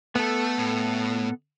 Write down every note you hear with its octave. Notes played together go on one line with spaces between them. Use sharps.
A3 B3 A4
A2